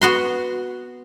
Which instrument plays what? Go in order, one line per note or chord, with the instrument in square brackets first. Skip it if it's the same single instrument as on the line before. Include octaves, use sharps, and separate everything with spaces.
[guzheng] B3 F#4 C6